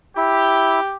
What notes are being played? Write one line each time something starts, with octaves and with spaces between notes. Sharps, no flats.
E4 G4